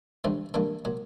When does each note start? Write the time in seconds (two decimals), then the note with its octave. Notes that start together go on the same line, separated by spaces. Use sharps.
0.24 A1 G2 D3 A3 C4
0.54 A1 G2 D3 A#3 D4
0.85 A#2 F#3